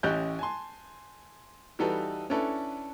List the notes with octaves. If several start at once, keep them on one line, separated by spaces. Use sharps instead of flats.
A1 C#4 G4 D#5 F#6 G6
G#5 A5 C6
E3 G3 D#4 F#4 A4 B4
C#4 D4 E4 A4 B4